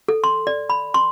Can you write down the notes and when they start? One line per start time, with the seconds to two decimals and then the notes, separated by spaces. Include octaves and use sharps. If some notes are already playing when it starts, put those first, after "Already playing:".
0.08 A4
0.24 C6
0.47 D5
0.70 B5
0.94 C6